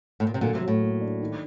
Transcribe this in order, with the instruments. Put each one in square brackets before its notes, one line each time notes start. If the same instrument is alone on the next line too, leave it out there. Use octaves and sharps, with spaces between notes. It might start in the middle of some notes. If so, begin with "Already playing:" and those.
[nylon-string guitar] A2
A#2
C3
[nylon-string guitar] A#2 D3 [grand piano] F#3
[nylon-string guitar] C3
[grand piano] F#3
[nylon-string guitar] A2
[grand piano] A#3
D4
D#3